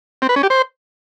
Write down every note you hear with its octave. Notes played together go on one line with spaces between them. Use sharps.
C4
B4
C#4
G4
C5